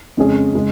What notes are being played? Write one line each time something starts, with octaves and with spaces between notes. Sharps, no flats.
F2 C#3 G#3 C#4 G#4
C#3 G#3